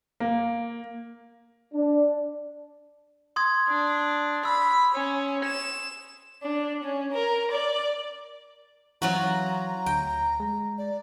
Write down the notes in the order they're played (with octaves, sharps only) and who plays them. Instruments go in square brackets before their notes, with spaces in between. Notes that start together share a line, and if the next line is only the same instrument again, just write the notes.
[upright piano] A#3
[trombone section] D4
[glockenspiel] C6 D#6 G#6
[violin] D4
[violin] B5 [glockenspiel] E6
[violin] C#4
E7
[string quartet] D4
C#4
A#4
D5
[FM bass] E3 [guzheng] F#3 F4 F#4 [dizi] A#5
[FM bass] D2 [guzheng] G5
[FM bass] G#3
[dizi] D5